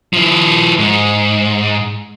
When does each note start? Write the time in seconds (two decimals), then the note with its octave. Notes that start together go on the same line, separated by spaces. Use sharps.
0.13 F3 E4
0.79 G#2